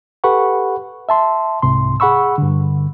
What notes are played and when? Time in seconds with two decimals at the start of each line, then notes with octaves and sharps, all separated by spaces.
0.24 G4 A4 B4 F#5 B5 C#6
1.09 E5 A5 C6
1.62 C2 G#2 C3 C6
2.00 G#4 F#5 B5 C#6 E6
2.38 G2 D3